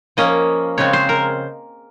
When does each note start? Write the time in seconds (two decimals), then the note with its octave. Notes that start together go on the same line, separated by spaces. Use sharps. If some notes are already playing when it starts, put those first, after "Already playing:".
0.17 F3 A#3 C#4 D#5
0.78 C#3 G#3 C4 C#5
0.93 C5
1.09 A#4